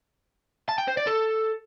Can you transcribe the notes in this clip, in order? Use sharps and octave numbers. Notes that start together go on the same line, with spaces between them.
A5
G5
C5
D5
A4